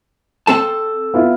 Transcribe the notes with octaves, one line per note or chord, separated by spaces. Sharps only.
C4 A4 A5
B3 E4 F4